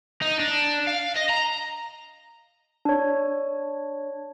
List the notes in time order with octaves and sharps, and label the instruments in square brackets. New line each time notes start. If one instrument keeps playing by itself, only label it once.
[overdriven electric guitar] D#4
D4
F5
D#5
A#5
[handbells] D4 C#5